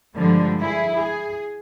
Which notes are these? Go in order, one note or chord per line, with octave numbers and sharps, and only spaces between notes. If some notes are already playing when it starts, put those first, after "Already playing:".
G2 D3 F3 G3 G#3
E4 G#4
G#4